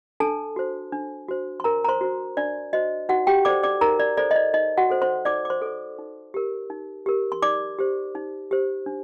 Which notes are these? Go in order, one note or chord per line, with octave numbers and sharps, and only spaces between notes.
D4 A4 A5
F#4 C5
D4
F#4 C5
C6
D4 A#4 A#5
A#5
C5 C6
F#4 C5
D4 D5
F#4 C5 D#5
D#4 F#4 F#5
G4 G5
A4 C5 D5 D6
D5 D6
D#4 A#4 A#5
D5
A4 C5 D5
D#5
D5
D#4 D#5
F#4 F#5
A4 C5
C5 C6
D#4 D5 D6
D6
C5 C6
A4 C5
D#4
G4 A#4
D#4
G4 A#4
C6
D#4 D5 D6
G4 C5
D#4
G4 C5
D4